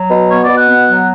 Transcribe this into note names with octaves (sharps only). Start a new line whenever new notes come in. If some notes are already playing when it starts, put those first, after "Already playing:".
Already playing: F#3
B2
B3 C#5
D5
B2
F#5
B3
F#3